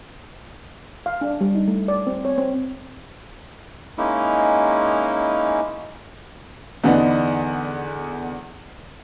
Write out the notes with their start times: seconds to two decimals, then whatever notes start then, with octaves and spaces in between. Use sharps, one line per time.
1.06 F5
1.21 D4
1.41 G3
1.55 D#4
1.68 A3
1.88 D5
2.07 C4
2.25 C#5
2.38 C4
3.98 G#3 A#3 C#4 D#4 E4
6.84 E2 D3 B3 D4 D#4